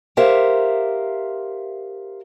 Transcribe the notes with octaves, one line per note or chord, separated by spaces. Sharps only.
G4 A#4 C5 E5 F5